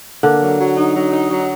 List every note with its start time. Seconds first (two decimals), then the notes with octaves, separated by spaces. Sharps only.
0.23 D3 A#3
0.41 F#3
0.59 F#3
0.76 D#4
0.95 F#3
1.12 D#4
1.30 F#3